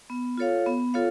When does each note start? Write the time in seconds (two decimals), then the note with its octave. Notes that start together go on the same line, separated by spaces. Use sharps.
0.10 B3
0.38 F4 A4 C#5 F5
0.66 B3
0.94 F4 A4 C#5 F5